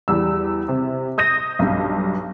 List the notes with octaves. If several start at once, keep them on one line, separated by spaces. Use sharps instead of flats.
E2 G3 E6
C3
D#6 G6 A#6 D#7
B1 G2